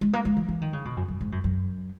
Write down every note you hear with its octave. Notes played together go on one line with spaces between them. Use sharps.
G#3
A#3
G#3
E3
E3
D#3
C#3
B2
F#2
F#2
G#2
F#2
F#2